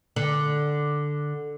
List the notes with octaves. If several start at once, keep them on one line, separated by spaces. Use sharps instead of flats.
D3